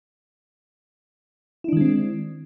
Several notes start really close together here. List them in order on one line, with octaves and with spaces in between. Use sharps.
E4 D4 D#3 G#3 C4